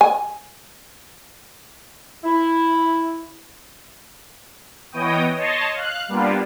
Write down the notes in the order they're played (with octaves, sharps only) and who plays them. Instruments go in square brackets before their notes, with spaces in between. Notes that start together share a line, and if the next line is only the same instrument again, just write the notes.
[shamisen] G#5
[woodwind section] E4
[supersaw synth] E3 B3 C#5 D#5 G5 D#6
C#5 D#5 A5 C6
F5 F#6
G3 A#3 B3 D4 F4